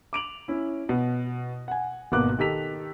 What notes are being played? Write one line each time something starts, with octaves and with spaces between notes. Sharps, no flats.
D6 D7 F7 F#7
C#4 E4
B2
F#5 G#5
G#1 B2 A#3 B3 D6 F#6
D#3 G4 A4 B6 F7